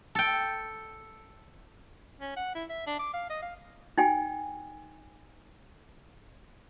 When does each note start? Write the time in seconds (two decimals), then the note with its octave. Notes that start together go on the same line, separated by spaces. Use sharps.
0.15 A4 G5
2.21 C#4
2.36 F#5
2.55 E4
2.70 E5
2.87 D4
3.00 D6
3.14 F5
3.30 D#5
3.42 F5
3.98 D#4 G5 G#5